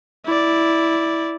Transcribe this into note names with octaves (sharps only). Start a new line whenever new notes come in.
E4 D5